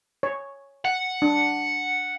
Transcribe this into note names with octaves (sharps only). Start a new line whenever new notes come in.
C#5
F#5
D4